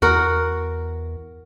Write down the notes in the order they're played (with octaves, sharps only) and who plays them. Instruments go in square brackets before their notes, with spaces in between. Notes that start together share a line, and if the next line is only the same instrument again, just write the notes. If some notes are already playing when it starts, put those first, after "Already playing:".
[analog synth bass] E2 [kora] F#4 A#4